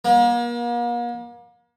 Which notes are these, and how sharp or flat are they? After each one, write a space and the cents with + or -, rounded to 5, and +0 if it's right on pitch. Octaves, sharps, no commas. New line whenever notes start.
A#3 +40